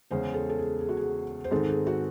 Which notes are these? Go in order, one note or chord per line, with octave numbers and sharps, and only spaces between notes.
E2 C#3 G#3 C#4 C5
A4
A4
G#4
G#4
F#4
G#4
C5
G#2 D#3 G#3 C4 A4
G#4
F#4